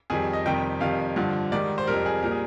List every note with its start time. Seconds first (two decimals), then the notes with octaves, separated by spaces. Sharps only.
0.10 F2 D#3 G3 G#4
0.33 D#5
0.45 F2 C3 D#3 G3 G5
0.80 F2 C3 D#3 G3 F5
1.16 G2 D3 F3
1.52 G#2 D#3 G3 D5
1.78 C5
1.87 F2 C3 G3 A#4
2.06 G#4
2.23 A#2 G3 A#4
2.31 G#4